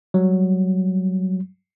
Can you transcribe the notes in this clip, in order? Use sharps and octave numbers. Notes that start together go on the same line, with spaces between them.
F#3 G3